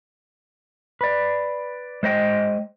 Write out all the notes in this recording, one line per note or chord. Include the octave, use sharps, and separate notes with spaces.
B4 D5
G#3 C5 D#5 G5